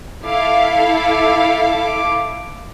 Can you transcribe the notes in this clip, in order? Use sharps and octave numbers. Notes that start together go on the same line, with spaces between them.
E4 A4 F5 D6